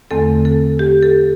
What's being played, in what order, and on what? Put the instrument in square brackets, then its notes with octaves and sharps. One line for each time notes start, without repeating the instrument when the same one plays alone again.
[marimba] E2 D3 A3 C4 A4
A4
G4
A4